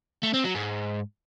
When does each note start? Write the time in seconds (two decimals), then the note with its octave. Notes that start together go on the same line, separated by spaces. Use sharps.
0.23 A3
0.34 C4
0.44 F#3
0.55 G#2